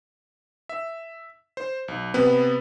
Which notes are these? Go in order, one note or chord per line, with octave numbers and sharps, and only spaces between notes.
E5
C5
B1
C3 B3 B4